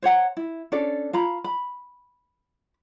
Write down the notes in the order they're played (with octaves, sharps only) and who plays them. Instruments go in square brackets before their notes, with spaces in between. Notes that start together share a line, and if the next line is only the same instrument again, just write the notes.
[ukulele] C5 C#5 F#5 A#5
E4
C#4 D4 A4 D5
F4 A#5 B5
B5